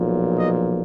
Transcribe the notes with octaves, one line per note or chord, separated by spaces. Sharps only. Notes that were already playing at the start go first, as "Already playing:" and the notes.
Already playing: B1 A#2 F3
D#5